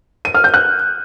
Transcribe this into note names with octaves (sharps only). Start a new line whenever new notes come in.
D#7
F6
G6
F#6